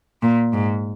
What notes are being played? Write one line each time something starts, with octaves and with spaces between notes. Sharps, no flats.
A#2
G#2